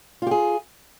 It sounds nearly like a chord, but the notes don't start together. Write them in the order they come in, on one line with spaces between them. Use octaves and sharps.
F4 G4 G#4